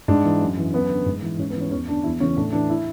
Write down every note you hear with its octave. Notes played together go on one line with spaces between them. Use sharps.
G#2 D4
E3
F#2
E3
F#2 B3
D3
G#2
E3
G#2 C#4
B3
E3 C#4
E2 C#4
D3 D4
E2 E4
C#3 E3 C#4
A2 D4
E3 D4
E4